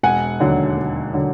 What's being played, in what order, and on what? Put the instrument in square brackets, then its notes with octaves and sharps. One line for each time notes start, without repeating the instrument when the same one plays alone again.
[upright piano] E1 F#5 G#5
D#2 D3 F#3
E1
D3 F#3